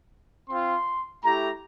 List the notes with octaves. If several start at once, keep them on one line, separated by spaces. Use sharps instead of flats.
C4 F4 C6
A3 E4 G4 A#5